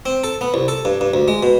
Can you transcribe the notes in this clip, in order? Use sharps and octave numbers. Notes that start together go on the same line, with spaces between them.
C4
A4
B3
C2
A4
G2
G2
D2
G#3
B2